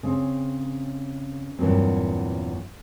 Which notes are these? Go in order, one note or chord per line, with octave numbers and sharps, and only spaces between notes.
C#3 C4
E2 G2 A#2 F#3 C4